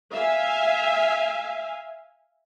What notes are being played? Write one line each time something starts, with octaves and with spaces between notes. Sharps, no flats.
E5 F5 G#5